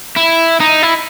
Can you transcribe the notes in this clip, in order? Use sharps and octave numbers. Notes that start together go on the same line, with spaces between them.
E4
D#4
E4